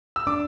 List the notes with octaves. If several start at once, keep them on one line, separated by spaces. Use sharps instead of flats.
E6
D4 D6